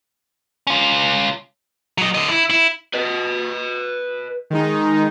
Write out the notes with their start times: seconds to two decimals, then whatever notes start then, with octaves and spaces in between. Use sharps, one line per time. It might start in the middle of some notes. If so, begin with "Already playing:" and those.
0.67 C#4 F4
1.98 F#3 D#5
2.15 D3 D#5
2.29 E4
2.50 E4
2.94 B4 D#5
4.50 D#3 G#3 D#4